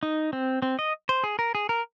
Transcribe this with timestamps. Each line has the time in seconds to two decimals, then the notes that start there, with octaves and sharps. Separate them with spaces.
0.03 D#4
0.33 C4
0.62 C4
0.79 D#5
1.09 C5
1.24 G#4
1.39 A#4
1.55 G#4
1.69 A#4